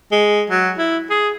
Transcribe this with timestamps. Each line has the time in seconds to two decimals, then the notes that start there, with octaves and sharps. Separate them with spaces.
0.12 G#3
0.50 F#3
0.78 E4
1.10 G#4